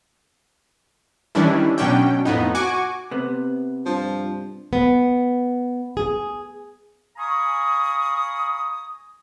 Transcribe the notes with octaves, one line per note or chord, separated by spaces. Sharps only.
D#3 E3 G3 C#4 D4 E4
B2 F#3 C#4 D4 G5
F2 A2 B3 D#4
F#4 G#5 C#6 D6
C3 B3
G2 F3
B3
G#4
F5 G#5 A#5 B5 C#6 D#6